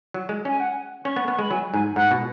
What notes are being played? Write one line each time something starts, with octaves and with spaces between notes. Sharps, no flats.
F#3
G#3
C#4 G#5
F#5
C#4 C#6
B3
B3 C#6
G#3 B5
F#3 G#5
G#2 G#5
G#2 F#5
B2